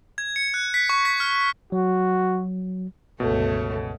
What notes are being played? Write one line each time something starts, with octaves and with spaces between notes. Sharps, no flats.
G#6
C#7
F#6
B6
C#6
B6
F6
F#3 F#4
G1 C#2 B2 A3 C#5